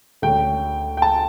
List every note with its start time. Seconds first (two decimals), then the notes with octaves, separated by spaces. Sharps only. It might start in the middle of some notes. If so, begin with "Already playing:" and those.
0.22 D2 D3 A3 C#4 G5
0.97 G5
1.02 A5